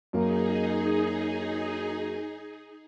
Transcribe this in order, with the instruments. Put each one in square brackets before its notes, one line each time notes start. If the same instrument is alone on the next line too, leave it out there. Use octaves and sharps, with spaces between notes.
[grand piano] F#2 A#3 [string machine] D#4 G#4